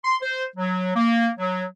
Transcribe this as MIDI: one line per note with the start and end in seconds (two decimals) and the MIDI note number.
0.05 0.16 84
0.22 0.43 72
0.56 0.92 54
0.96 1.29 58
1.39 1.63 54